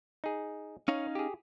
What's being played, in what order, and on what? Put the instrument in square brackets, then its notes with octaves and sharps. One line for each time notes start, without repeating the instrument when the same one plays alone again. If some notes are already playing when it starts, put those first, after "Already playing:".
[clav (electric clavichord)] D#4 G#4
[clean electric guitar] C#4 D#4 F5 [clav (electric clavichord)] C#5
[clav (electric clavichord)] G4 G#4